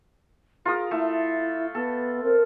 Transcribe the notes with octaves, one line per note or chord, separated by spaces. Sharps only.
F4 G#4 A#4 D#6
A3 E4
B3 A4
C4 A#4